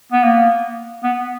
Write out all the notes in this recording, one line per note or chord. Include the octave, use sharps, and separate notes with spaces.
B3
A#3
B3